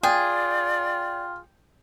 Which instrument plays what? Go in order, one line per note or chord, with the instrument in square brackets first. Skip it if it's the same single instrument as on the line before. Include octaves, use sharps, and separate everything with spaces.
[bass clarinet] F4 [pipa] G#4 [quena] D5 [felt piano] G5